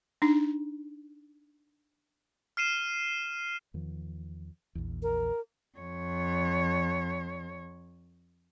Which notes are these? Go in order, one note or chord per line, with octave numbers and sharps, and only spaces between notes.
D4 D#4
F6 C7 D#7 E7
E2 D#3 F3
A#1 E2
A#4
F2 C#5